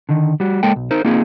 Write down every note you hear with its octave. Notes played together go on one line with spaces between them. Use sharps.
D3 D#3
G3 F#4
G#3 A#3 A4 G5
B1
D#4 A#4 C5
A#3 C4 D#4 F4 G#4